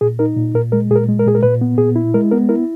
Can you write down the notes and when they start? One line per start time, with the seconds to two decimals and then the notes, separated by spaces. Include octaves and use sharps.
0.01 A#2 G#4
0.19 D#4 A#4
0.36 A#2
0.55 A#2 A#4
0.72 G#3 A#4
0.91 A#2 G#4
0.95 A#4
1.08 G#3
1.19 A#4
1.26 A#2 G#4
1.35 A#4
1.43 A#2 B4
1.61 B3
1.78 A#2 G#4
1.96 E4
2.14 G#3 A#4
2.31 B3 A#4
2.49 E4 A#4